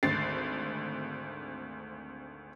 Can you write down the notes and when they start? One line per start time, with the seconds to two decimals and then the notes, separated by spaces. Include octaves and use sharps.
0.03 G#1 D2 A6 C7